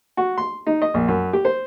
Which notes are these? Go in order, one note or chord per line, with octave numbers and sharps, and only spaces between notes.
F#4
C6
D#4
D#5
A#1
F#2
G4
C5